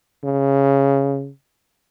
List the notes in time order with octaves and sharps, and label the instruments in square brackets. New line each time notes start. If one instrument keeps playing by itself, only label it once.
[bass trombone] C#3